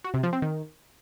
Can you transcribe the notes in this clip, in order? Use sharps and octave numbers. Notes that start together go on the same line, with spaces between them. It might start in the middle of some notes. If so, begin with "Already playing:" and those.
F#4
C3
F3
C4
D#3